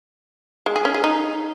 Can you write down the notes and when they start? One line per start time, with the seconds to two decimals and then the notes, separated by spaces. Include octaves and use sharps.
0.66 G#3
0.76 G#4
0.85 C#4
0.94 G#4
1.04 D#4